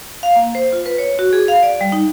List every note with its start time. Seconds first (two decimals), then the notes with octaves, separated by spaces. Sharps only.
0.23 F5
0.36 A#3
0.55 C5
0.72 F4
0.86 B4
0.98 C#5
1.19 F#4
1.33 G#4
1.48 F5
1.63 D5
1.81 G3
1.92 D#4